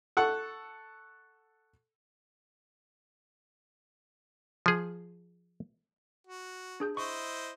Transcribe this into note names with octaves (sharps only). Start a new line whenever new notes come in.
A4 F#5 C#6 F#6
F3 G#4
F#4
D4 G#4 G6
E4 C5 D#5 C#6